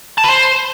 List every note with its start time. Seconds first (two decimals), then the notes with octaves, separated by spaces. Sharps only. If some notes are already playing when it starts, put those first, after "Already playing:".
0.18 A5
0.24 B4
0.29 C5